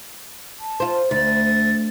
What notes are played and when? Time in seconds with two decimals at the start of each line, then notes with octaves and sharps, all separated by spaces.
0.60 A5
0.80 F4 C5
1.11 D2 A6